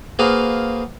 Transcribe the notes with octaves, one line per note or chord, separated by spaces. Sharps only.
A#3 F#4 G#4 B4 C5 F5